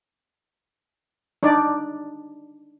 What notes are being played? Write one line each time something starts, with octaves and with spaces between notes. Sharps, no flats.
D4 D#4 D5